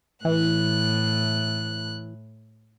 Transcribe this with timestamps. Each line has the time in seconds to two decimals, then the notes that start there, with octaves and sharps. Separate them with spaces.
0.25 A2 E3 F#6